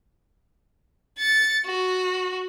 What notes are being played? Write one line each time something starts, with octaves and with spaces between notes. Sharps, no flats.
A6 C#7
F#4